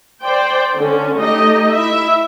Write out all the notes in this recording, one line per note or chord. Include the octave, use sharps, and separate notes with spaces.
C5 D5 G5
D3 C#4
A3 D#4 G4 D#5
E4 E5